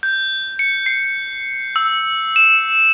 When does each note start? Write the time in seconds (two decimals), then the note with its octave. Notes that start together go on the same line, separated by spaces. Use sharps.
0.03 G6
0.59 C#7
0.86 C7
1.76 E6
2.36 E7